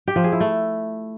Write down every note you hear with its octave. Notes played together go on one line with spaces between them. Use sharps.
G4
F3
G#4
E4
A3